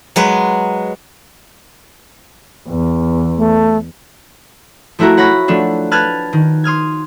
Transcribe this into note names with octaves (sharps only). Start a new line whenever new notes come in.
F#3 G#3 B4
E2
A3
F3 A3 E4 F#4 A#4
C#5 F#5 B5 A#6
F3 A3 D4
B4 A5 F6 F#6 G#6 A6
D#3
C6 D#6 F6 G#6